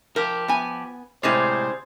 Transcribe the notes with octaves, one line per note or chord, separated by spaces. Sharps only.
F3 G4 A#4
B3 G#5
A2 C3 G#3 G#4 C5 D5 F5